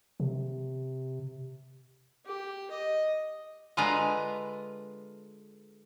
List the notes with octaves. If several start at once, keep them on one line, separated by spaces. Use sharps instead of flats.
C3
G4
D#5
D3 G#3 F4 B4 G#5 A#5